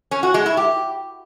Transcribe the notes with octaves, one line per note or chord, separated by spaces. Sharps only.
C#4
F#4
G#3
E4
G4